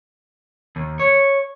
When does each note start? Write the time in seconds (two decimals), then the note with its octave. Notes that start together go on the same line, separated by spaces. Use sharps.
0.76 D#2
0.99 C#5